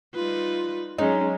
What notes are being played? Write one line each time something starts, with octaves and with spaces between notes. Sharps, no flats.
G3 D#4 F4 B4
F#3 G#3 C#4 D#4 C#5